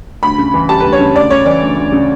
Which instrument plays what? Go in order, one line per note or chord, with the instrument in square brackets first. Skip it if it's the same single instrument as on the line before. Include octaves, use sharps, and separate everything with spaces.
[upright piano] D2 B5
C#3
E3
G3 A5
D2 B4
C#5
C#3
D2 D5
C#3 C#5
E3 D5
D2
D2
C#3